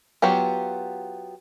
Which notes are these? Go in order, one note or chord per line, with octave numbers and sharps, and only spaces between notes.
F#3 B3 F4 G4